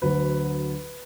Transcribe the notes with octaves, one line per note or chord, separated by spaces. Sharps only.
D2 D3 F#3 B4